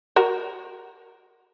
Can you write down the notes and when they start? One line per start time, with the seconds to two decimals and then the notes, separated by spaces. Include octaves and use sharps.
0.16 F#4 A#4